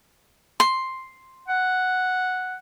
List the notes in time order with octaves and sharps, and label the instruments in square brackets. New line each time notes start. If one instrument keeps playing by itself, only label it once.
[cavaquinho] C6
[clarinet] F#5